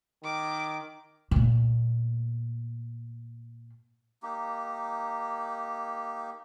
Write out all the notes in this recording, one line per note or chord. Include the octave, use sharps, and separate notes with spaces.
D#3 D6
A#2 A3
A#3 D#4 G4